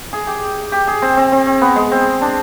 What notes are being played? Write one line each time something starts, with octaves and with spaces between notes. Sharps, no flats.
G#4
G4
G4
G#4
C4
C4
C4
C4
B3
G#3
C4
D4